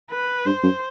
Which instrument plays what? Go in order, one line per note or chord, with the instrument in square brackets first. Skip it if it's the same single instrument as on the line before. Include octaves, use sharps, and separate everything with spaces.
[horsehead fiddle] B4
[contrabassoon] G2 [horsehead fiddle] C5
[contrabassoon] F#2